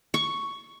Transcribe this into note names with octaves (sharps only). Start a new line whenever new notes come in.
C#6